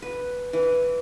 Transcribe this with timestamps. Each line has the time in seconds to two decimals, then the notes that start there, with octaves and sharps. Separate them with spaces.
0.02 B4
0.53 E3